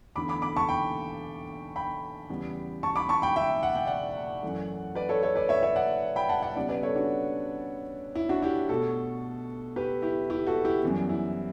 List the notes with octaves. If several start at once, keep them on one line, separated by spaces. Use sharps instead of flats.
E2 D3 A3 B5 D6
B5 D6
B5 D6
A5 C#6
G5 B5
G5 B5
E2 C#3 G3 B3
A5 C#6
B5 D6
A5 C#6
G5 B5
E5 G5
F#5
G5
D5 F#5
F#2 E3 A3
B4 D5
A4 C#5
A4 C#5
B4 D5
C#5 E5
C#5 E5
D5 F#5
G5 B5
F#5 A5
D5 F#5
C#3 G3 B3 D5 F#5
B4 D5
A4 C#5
D4 F#4
E4
D4 F#4
E4 G4
B2 A3 F#4 A4
G4 B4
E4 G4
E4 G4
F#4 A4
E4 G4
F#2 E3 G3 B3
E4